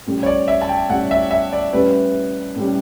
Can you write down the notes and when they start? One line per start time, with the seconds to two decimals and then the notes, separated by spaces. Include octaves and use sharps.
0.06 A2 G3 C#4
0.23 C#5
0.26 D5
0.48 E5
0.61 A5
0.69 G5
0.89 A2 G3 C#4 F#5
1.11 E5
1.31 E5
1.53 D5
1.73 A2 G3 C#4 B4
2.56 A2 G3 C#4